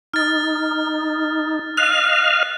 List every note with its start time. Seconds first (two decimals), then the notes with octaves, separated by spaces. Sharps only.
0.14 D#4 F6 A6
1.77 D#5 F5 F6 F#6